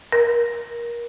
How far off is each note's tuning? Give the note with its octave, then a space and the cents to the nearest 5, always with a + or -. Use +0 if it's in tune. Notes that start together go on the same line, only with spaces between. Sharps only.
A#4 +25